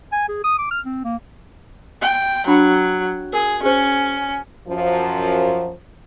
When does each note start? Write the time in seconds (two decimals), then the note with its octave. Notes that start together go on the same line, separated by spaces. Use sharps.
0.12 G#5
0.29 G#4
0.44 D#6
0.58 D6
0.71 F6
0.85 C4
1.04 A#3
2.02 G5
2.47 F#3 D4 B5
3.33 G#4 A#4
3.63 C#4 G#4 C5
4.69 F#2 F3